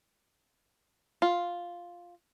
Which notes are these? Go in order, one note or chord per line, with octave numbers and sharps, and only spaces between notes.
F4